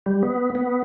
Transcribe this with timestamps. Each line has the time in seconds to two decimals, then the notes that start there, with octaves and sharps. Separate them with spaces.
0.06 G3
0.23 B3
0.55 B3